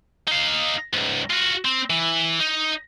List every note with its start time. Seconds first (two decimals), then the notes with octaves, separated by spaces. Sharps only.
0.28 D#4 F5
0.94 C#2 G#2
1.30 F4 F#4
1.65 C4
1.90 E3
2.40 D#4